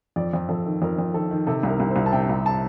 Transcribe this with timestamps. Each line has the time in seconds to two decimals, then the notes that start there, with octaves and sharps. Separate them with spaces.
0.16 F2 D5
0.33 F2
0.49 F2 A4
0.66 D#3
0.82 F2 A#4
0.98 F2
1.14 D#3 A4
1.31 D#3
1.47 C3 A4
1.63 C2
1.69 A#4
1.80 C2
1.91 C5
1.96 C2
2.06 A5
2.12 C3 G5
2.29 C2
2.46 A5